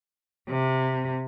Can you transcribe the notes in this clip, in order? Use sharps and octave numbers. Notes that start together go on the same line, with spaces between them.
C3